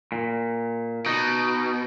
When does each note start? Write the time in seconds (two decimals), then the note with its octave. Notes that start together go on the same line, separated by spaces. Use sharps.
0.12 A#2
1.06 B2 D#4